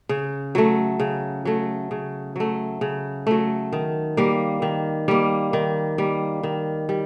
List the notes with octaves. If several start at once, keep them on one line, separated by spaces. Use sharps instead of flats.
C#3
F#3 A3
C#3
F#3 A3
C#3
F#3 A3
C#3
F#3 A3
D#3
G3 A#3
D#3
G3 A#3
D#3
G3 A#3
D#3
G3